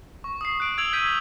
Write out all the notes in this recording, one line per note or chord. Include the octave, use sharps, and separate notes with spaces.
C#6
D#6 C7
F#6 D7
E6 G#6 D7 F7 F#7
E6 G6 G#6 B6 D#7